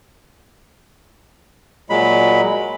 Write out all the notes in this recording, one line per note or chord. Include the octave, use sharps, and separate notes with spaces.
A#2 F#3 G#3 B5